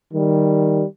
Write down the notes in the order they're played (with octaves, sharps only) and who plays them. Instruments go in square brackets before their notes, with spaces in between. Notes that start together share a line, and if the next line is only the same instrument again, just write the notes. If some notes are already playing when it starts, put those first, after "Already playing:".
[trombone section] D#3 G3